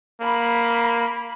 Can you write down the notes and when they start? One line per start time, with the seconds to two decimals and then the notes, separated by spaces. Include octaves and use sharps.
0.21 A#3 B5